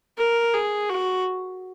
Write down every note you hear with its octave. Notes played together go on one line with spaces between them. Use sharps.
A#4
G#4
F#4